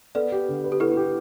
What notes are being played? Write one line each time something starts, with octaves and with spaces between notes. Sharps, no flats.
B3 A4 D5
G4
D3
B4
G4
B3 E4 A4
G4